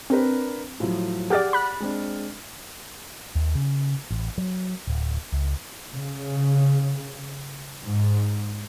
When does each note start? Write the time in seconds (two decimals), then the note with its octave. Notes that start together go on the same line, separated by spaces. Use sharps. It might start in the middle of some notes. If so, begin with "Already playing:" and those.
0.10 C4 D4 A#4 B4
0.80 A2 F3 F#3
1.30 G4 G#4 D5 F#5 F6 A6
1.53 B5 F#6
1.80 G#3 C4 D4
3.35 D#2
3.55 C#3
4.11 A1
4.38 F#3
4.87 D1
5.32 C#2
5.92 C#3
7.85 G#2